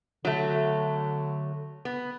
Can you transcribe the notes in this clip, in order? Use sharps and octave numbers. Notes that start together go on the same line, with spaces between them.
D3 F#3 A3
B3